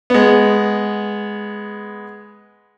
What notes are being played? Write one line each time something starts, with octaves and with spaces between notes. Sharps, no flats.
G#3 B3